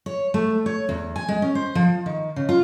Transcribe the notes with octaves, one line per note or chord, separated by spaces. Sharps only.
C#5
A3
C#5
E2
G#5
G#3
C#4
C5
F3
D#3
C#3
F4